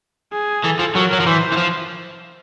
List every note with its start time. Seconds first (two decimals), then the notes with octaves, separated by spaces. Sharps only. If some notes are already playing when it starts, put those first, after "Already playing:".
0.33 G#4
0.64 E3 A4
0.79 F3
0.95 F#3 A#4
1.13 F#3
1.20 F3
1.26 E3 C5
1.52 E3
1.57 F3